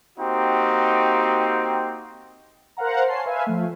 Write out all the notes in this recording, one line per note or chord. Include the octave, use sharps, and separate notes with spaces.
A#3 C4 D#4 F#4 G4
A#4 C5 F5 F#5 A#5
C#5 G#5 A5 C6 C7
B4 E5 F5 G#5
F3 A3